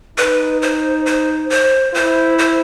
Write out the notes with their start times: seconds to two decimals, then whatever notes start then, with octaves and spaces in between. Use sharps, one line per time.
0.18 D#4 B4
0.62 C5
1.06 C5
1.50 C5
1.94 E4 C5
2.38 C5